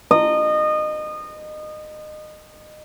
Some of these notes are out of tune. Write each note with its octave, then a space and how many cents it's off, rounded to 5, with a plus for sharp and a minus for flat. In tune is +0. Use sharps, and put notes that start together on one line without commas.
D#5 -25